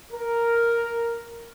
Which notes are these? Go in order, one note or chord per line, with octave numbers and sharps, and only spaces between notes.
A#4